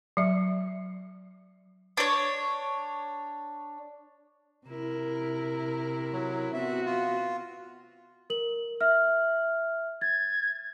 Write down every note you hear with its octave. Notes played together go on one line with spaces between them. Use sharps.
F#3 E5
D4 C#5
C3 E4 A#4
F#3
B3 C4 F#4 E5
F4
A#4 F#7
E5 F6
G#6 A6